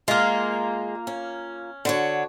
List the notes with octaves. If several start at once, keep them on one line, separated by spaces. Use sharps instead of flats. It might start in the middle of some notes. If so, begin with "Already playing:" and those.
G#3 A#3 F4
C#4
D3 F#4 C#5